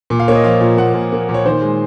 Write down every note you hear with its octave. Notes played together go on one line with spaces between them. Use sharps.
A#2
F5
A#3 C#5
D#5
F3 F5
A#2
A#2 F#5
A#2
A#3
A#2
C#5
D#3 C5
G#3